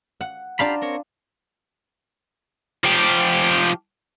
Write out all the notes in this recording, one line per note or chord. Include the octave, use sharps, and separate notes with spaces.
F#5
D4 F4 G4 F5 A#5 B5
C4 A#4 C#5
F3 G4